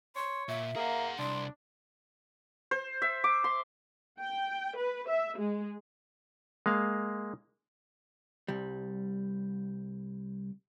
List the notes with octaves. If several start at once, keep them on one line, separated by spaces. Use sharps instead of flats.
C#5 C6
A#2 E5
A#3 G#4 F#5
C2 D4 C6
C5
E5
D6
C6
G5
B4
E5
G#3
G#3 A#3 F5
C2 G3